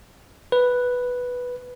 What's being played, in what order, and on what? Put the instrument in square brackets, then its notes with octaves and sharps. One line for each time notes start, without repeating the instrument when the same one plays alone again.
[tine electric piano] B4